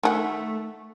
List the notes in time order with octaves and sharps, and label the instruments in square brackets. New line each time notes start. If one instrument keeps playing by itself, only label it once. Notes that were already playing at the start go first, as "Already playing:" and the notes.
[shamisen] D#3 G#4 F#5 [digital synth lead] A3